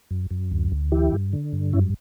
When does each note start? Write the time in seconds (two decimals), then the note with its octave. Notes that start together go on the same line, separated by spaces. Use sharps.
0.11 F#2
0.31 F#2
0.52 D2
0.72 D2
0.92 E3 E4 G4
1.12 G2
1.33 D3
1.53 G2
1.73 F#2 C#4 E4